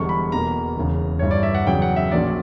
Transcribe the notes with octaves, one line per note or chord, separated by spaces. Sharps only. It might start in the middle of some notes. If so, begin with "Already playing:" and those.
Already playing: E1 E2 D3 G3 C#6
B5
E2 B2 A#3 A#5
E1 E2 C#3
G1 G2 E3 C#5
D5
E5
F#5
E2 C#3 F#3 G5
F#5
E5
A#1 A#2 F#3 C#4 D5